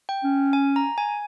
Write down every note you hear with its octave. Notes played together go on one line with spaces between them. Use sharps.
G5
C#4
G#5
A#5
G#5